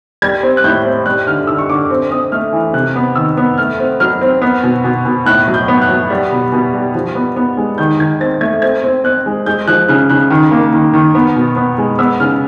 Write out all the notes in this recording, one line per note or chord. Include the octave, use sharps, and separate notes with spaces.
G3 G#6
C4
F#6
A2 G6
C4
G3 F#6
D3 F6
D3 E6
C#6
D3 D6
C4
C4 D#6
A3 F6
E3
C3 F#6
B3
D#3 E6
B3
A3 F6
C4
F#3 F6
C4
B3
B2
B2
B2
A2 F#6
F#3
G6
B3
F#6
F#3
G3
B2
B2
G3
F3
B3
B3
G#3
D#3 G6
D#3 G#6
C4 A6
A3 G#6
C4 G#6
C4
C4 F#6
G#3
G#3 G6
F3 F#6
C#3 F#6
C#3 F#6
D#3
A#3
D#3
D#3
B3
B2
B3
G#3
B3 E6
C#3 F6